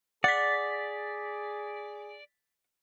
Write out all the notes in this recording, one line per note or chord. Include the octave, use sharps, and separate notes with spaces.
G#4 D5 F#5 A6 B6